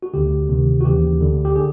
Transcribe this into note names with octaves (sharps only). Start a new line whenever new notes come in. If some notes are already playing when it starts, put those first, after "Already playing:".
F#4
D2 D3 G4
D2 C3 D#3
F#4
D#2 C#3 E3 G4
D2 D3
G4
D3 G#4